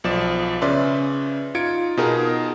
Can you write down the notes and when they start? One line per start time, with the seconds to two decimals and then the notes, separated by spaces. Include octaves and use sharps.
0.04 B1 F3 D5 E7
0.61 C#3 C#4 B4 D5 E5 C6
1.55 D#4 F4 G#6 C#7 D7
1.97 B2 D#4 F4 G#4 A#4